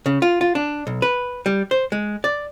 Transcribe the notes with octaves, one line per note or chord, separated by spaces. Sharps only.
C#3
F4
F4
D4
B1
B4
G3
C5
G#3
D5